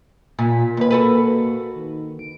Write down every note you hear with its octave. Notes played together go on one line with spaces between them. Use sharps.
A#2 B6
D#2 A#3 B4
F#4 A4 B4
D#3
D7